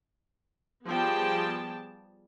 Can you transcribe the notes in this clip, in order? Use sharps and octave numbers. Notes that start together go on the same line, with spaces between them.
F3 G3 B3 G#4 G5 A5